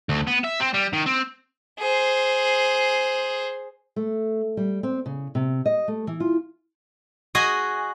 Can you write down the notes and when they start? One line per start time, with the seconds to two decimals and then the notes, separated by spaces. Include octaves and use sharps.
0.09 D2
0.27 B3
0.44 E5
0.60 C4
0.74 G3
0.93 D#3
1.06 C4
1.79 G#4 C5
3.96 A3
4.57 G3
4.83 C4
5.06 C#3
5.35 C3
5.66 D#5
5.88 A3
6.07 E3
6.20 F4
7.35 F#4 G#4 D#5 G#5